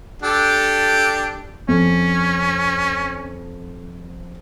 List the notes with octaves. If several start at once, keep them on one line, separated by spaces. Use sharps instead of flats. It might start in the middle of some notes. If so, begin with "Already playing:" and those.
D4 G4 A4
F2 C#4